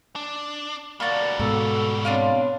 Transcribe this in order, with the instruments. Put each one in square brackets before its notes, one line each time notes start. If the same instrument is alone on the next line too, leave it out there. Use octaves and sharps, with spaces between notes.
[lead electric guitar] D4
[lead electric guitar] G3 F#4 [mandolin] A#3 A5 [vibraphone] D5 F5 A#5
[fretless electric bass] G#2 B2 [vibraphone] A4 E6
[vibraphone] B3 C4 C#5 [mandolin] D4 F4 F5